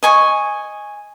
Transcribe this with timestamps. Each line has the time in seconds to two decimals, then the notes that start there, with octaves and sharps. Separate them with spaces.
0.03 D#5 G#5 C#6